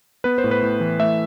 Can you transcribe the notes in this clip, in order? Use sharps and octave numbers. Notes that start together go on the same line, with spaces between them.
B3 B4
C5
A2
B4
A2
E3
A3 E5